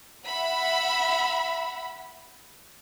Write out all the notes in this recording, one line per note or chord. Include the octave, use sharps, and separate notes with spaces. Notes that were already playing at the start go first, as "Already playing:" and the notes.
E5 F#5 B5